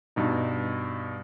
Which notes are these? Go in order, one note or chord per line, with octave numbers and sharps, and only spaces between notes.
G2 B2 D#4